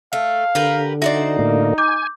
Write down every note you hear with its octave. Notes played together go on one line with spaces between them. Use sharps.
A3 F5
D3 G4 A#4 B4
D#4 F#4 C5 D5 E5
A2 D3 A#3
G#5 D6 G6